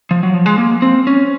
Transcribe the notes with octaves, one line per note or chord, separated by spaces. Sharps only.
F3
F#3
F3
G#3
A#3
C4
C#4